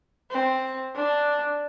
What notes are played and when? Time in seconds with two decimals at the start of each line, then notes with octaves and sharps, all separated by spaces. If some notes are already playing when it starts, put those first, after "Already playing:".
0.30 C4
0.95 D4